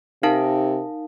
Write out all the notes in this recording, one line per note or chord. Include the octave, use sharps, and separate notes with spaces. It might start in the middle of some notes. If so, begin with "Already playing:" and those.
C3 D#4 A#4 F5 A5